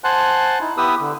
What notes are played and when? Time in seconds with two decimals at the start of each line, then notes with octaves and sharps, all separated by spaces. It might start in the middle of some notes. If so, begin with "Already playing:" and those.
0.04 C5 F#5 G#5 A5 C6 F#6
0.60 D#4 E4
0.77 B3 E4 G4 B4 D#6 E6
1.00 D3